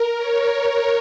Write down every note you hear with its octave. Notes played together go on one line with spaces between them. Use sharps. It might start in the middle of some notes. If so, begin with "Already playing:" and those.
Already playing: A#4
C#5